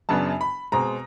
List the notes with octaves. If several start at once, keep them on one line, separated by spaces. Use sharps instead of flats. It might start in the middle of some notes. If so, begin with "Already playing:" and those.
F#2 C#3 F#3 B3 D4 A5
B5
B2 G#3 C4 A#5